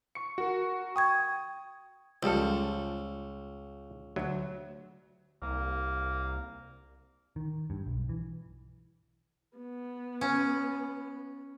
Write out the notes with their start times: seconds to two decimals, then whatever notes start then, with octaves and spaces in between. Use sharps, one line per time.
0.15 C#6 C#7
0.38 F#4 A#4
0.96 G5 C#6 D#6 G#6
2.23 C#2 F3 G3 A4
4.16 D2 F#3
5.42 C2 A#3
7.36 D#3
7.70 G2
7.86 B1
8.09 E3
9.57 B3
10.21 C#4